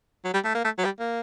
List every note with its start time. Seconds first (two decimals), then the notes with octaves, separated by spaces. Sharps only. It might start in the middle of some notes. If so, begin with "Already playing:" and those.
0.25 F#3
0.34 G3
0.45 A3
0.55 A#3
0.64 A3
0.78 F#3
0.84 G3
0.99 A#3